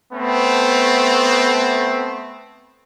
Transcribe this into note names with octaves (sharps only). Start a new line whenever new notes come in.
A3 B3 C4